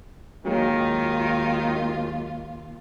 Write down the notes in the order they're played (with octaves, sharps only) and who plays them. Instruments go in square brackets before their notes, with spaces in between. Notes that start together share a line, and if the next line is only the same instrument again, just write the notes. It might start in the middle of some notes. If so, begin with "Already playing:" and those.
[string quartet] D#2 F4 [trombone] D#3 [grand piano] F#3 G#3 A#3